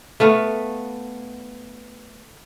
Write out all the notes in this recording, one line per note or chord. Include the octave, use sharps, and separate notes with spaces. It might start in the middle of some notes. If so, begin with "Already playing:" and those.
A3 B3 F5